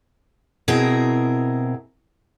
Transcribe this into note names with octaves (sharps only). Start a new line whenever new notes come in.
B2 C4 E4 G#4 A#4